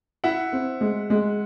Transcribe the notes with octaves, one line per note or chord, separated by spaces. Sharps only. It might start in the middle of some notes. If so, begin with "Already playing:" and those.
E4 E5 F#5
C4
G#3
G#3